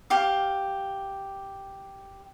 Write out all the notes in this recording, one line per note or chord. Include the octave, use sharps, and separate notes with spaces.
G4 F5 D6